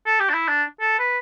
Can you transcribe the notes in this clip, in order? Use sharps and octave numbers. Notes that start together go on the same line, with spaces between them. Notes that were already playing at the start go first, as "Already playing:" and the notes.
A4
G4
D4
E4
D4
A4
B4